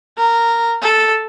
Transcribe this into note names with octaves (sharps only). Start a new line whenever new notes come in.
A#4
A4